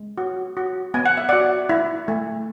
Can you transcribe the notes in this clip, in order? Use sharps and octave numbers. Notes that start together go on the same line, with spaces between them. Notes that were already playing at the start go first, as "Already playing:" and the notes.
Already playing: G#3
F#4
F#4
B3 G#5
F#5
E5
F#4 D5 F#5
E4
A3